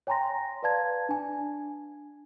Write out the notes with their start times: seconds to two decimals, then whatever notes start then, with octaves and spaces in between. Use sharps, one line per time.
0.07 C#5 G5 G#5 A#5 C6 A#6
0.63 B4 D5 F5 A5 G#6
1.09 D4 G#5